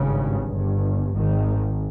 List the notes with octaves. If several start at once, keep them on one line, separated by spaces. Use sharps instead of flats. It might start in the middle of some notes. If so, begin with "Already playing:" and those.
Already playing: G#1 G2 C#3
G1 G2
G#1 G#2 D#3